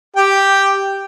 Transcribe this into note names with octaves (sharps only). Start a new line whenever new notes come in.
G4 G5